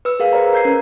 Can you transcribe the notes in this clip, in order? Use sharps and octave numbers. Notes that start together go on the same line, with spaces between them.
B4 E6
G#4 A#4 F5
B4 C5 D5 A#5
A#4 A#5 G6 G#6 C7
C#4 A#4